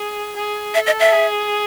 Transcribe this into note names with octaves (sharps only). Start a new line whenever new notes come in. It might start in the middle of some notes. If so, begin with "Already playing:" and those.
Already playing: G#4
G#4
A4 E5
D#5
E5
G#4